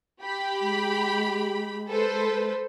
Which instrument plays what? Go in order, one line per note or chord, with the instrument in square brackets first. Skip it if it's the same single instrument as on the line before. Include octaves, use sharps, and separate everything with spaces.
[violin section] G4 B5
[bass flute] G#3
[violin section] A4 B4 C5